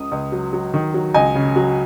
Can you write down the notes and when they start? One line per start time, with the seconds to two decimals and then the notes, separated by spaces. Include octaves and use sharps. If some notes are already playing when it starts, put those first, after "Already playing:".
Already playing: C#2 C#3 D#6
0.11 C#2
0.32 F#3
0.53 F#3
0.74 D#3
0.94 F#3
1.14 C#2 D#5 G#5
1.35 C#3
1.56 F#3